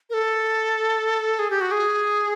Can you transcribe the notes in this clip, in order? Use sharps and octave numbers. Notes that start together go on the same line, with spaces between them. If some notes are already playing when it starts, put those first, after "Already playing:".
A#4
A4
G#4
G4
F#4
G#4